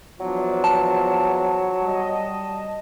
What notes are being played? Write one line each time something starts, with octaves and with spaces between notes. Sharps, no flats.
E2 F3 F#3 D4
A5
G3 D#5